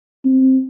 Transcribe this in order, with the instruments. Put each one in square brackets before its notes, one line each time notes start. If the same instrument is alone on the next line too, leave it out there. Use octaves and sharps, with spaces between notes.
[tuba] C4